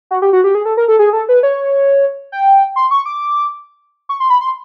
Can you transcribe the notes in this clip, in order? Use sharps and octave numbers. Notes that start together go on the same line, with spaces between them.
F#4
G4
F#4
G4
G#4
A4
A#4
A4
G#4
A4
B4
C#5
G5
C6
C#6
D6
C#6
C6
B5
C6